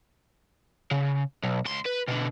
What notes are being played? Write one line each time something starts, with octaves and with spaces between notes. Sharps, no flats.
C#3
B1
C#2 C6
B4
B2 D3